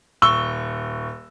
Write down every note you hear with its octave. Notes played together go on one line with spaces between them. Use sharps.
D#1 C#6 E6 G7